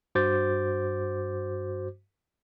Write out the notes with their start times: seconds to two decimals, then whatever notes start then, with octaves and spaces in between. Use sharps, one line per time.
0.15 G2 F#4 C5 D6 G6 A6